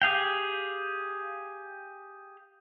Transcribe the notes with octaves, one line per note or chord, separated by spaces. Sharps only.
G4 G#4 F5 G5